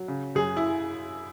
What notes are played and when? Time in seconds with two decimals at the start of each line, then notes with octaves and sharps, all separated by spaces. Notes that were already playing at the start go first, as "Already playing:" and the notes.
Already playing: F#3
0.08 C#3
0.35 F#2 G#4
0.57 E4